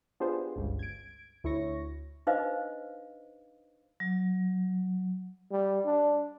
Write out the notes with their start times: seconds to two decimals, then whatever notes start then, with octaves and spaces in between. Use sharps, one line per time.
0.20 B3 D4 F4 G4 G#4 C5
0.56 G1 C#2
0.79 G#6 D7
1.44 D2 E4 C#5 C#6 A#6
2.27 D4 D#4 B4 C5 D#5 F5
4.00 F#3
5.51 G3
5.86 D4